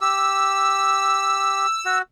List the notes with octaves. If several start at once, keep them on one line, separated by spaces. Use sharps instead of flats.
G4 E6
F#4